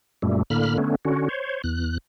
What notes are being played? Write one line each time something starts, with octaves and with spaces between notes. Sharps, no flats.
F#2 A#2 G3 A3
A2 D3 A#3 B5 F6
D3 A3 B3 C#4
D3 C#4 F#4
C5 C#5
E2 F#6